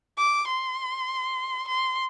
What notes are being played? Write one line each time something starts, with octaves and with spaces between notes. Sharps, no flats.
D6
C6
C6